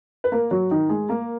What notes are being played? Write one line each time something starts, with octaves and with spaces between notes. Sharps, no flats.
B4
A#3 A#4
F#3 F#4
D#3 D#4
G#3 G#4
A#3 A#4